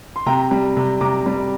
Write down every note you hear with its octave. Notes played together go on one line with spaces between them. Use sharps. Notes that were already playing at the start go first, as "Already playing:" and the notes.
C6
C3 G5 A#5
G3
C3
C3 A#5 D6
G3